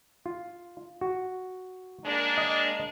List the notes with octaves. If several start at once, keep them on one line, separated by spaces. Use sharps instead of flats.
F4
F#4
G#3 A#3 D4
D#5